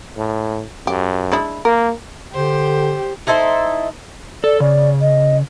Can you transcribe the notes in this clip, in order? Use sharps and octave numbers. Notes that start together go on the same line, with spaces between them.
A2
F#2 G4
G#3 D4 E4
A#3 A#4
D3 G4 C5
D#4 E4 A4 C5
A4 D5
C#3 D5
D#5